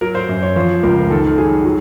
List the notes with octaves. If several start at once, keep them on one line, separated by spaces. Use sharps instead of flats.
F#3 A#4
C5
F#2
C#5
F3 C5
C#2 A#4
D#3 A4
F#3 G#4
F#3